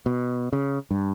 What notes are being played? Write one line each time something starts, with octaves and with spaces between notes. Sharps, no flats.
B2
C#3
G2